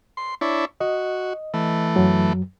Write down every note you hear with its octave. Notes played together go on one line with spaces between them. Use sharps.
C6
D4 E4 C#5
F#4 D#5
E3 A3
F#2 F#3